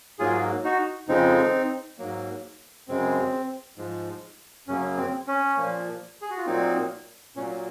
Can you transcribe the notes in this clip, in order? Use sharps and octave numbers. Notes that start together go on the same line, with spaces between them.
G#2 F#3 A#3 F4 G#4
D#4 F#4
F2 C#3 F3 G#3 C4 D#4
G#2 F#3 A#3
F#2 C#3 G#3 C4
G#2 F3 G#3
F#2 C#3 F#3 A#3 C#4
C4
C#4
A#2 F3 A#3
G#4
F#4
F4
A#2 F#3 A#3 C4 D#4
A#2 F#3 A#3 C#4